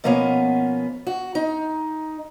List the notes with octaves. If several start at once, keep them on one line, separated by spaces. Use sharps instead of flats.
B2 F3 A#3 B3 C#4
F#4
D#4